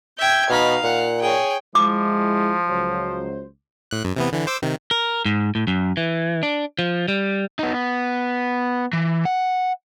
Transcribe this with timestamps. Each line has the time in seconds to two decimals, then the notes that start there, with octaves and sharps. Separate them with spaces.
0.18 E5 G5 G6 G#6
0.50 B2 D#4 F5 B5
0.84 A#2 F#5
1.22 G#4 C#5 G5
1.75 F3 G#3 E4 D6
2.67 C#2 F#3 C5
3.91 A2 F#6
4.05 F#2
4.16 C3 E3 B3
4.32 D3 E3
4.47 C5 D6 E6
4.62 C3 D#3
4.91 A#4
5.25 G#2
5.55 A2
5.67 F#2
5.97 E3
6.43 D4
6.79 F3
7.08 G3
7.59 B3 D#4
7.74 B3
8.93 E3
9.25 F#5